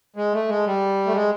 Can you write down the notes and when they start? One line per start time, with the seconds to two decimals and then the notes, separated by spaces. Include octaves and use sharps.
0.16 G#3
0.33 A3
0.48 G#3
0.66 G3
1.06 A3
1.13 G#3